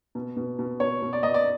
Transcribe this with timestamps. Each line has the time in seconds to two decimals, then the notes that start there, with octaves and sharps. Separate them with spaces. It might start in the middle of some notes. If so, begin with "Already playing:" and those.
0.15 B2
0.37 B2
0.59 B2
0.80 B2 C#5
1.02 B2
1.13 D5
1.23 B2 D#5
1.34 D5